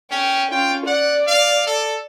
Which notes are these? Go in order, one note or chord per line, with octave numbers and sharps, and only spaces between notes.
C#4 G5
C#4 F4 G5
D5 F#5
F5
A4